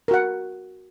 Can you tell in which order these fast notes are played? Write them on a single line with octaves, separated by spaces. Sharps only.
A#4 F#4 F#5